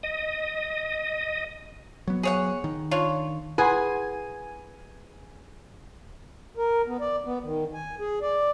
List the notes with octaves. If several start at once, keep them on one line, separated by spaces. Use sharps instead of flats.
D#5
F#3 B3
G#4 C#5 F#5
D#3
D4 F4 C#5
E4 G#4 B4 F#5 G#5 C6
A#4
B3
D5
B3
D#3
G#5
G#4
D5